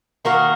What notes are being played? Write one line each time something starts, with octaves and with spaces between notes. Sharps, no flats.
D#3 A#3 F#4 A#4